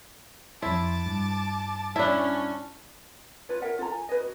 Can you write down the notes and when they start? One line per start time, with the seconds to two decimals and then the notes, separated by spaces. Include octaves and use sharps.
0.62 F2 E4 A5 C6 D6
1.06 G2
1.96 C#4 D4 E4 A5
3.49 F4 B4 C#5
3.62 A#4 C#5 E5 F#5
3.79 F4 A4 C#5 A#5
3.91 G#5
4.09 B4 C#5 D#5
4.21 F#4